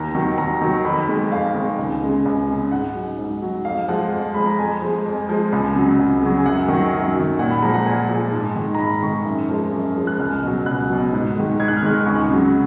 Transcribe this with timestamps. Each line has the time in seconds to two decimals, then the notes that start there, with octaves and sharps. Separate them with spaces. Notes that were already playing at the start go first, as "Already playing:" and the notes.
Already playing: D#2 A#5
0.15 D#3 F#3
0.38 D#2 A#5
0.62 D#3 F#3
0.85 F2 B5
1.09 D#3 G#3
1.32 F2 F5
1.55 D#3 G#3
1.78 C#2
2.02 C#3 G#3
2.25 C#2
2.49 C#3 G#3
2.72 G#2 F#5
2.95 F#3
3.18 G#2
3.42 F#3
3.65 F2 F5
3.88 F3 G#3 F#5
4.12 F2
4.34 F3 G#3 B5
4.46 A#5
4.59 F2 G#5
4.82 F3 G#3
5.05 F2
5.29 F3 G#3
5.52 C#2 G#5
5.75 C#3 F#3
5.99 C#2
6.22 C#3 F#3
6.37 G#5
6.46 F#2 F#5
6.68 D#3 F#3
6.92 F#2
7.16 D#3 F#3
7.39 A#2 F#5
7.50 B5
7.62 F3 G#3 A#5
7.74 F#5
7.86 A#2 G#5
8.09 F3 G#3
8.32 G#2
8.56 D#3 G#3
8.75 A#5
8.79 G#2 B5
9.02 D#3 G#3 C#6
9.25 F#2
9.49 F3 G#3
9.72 F#2
9.96 F3 G#3
10.07 F#6
10.19 C#2 F6
10.43 B2 F#3
10.66 C#2 F#6
10.89 B2 F#3
11.13 G#2
11.36 D#3 G#3
11.59 G#2 G#6
11.68 F#6
11.77 F6
11.83 D#3 G#3 F#6
12.06 C#2 C#6
12.30 C#3 F#3